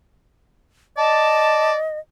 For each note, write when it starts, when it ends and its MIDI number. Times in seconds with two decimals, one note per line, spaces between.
0.97 1.76 74
0.97 1.99 75
0.97 1.70 81